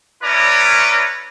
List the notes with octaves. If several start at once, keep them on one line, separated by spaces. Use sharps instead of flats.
C#4 E4 B4 D5 A#5